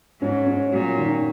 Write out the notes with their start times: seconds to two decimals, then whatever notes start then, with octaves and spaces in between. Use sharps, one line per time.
0.21 G#2 C#4
0.47 C#4
0.72 A#2 F#3
0.98 D#3